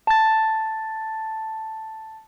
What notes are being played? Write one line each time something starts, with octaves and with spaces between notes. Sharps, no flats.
A5 A6